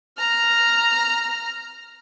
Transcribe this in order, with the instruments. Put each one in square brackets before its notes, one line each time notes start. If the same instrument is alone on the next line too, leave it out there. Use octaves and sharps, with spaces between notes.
[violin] A#5 F6